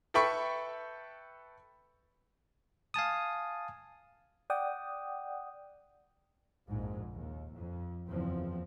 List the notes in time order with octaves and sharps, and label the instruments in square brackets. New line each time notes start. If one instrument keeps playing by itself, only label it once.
[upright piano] A4 B4 E5 G5 B5 C#6
[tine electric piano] F5 G#5 A5 D#6
[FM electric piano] D5 F#5 G5 D#6
[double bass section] A#1 F2 G#2
D#2
F2
F#1 E2 F3 C4